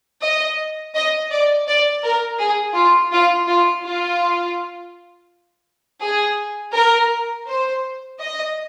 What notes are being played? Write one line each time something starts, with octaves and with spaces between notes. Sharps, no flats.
D#5
D#5
D5
D5
A#4
G#4
F4
F4
F4
F4
G#4
A#4
C5
D#5